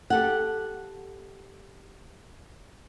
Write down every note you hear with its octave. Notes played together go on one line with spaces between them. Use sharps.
G4 A4 F#5